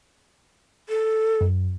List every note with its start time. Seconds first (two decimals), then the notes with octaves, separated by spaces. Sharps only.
0.89 A4
1.41 F#2